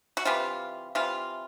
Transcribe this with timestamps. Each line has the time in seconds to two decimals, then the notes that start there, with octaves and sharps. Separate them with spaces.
0.17 F#4
0.25 C3 E3 G3 F4
0.95 C3 E3 G3 F4